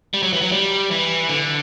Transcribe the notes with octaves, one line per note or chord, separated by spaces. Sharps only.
G3
F#3
E3
F#3
G3
E3
D3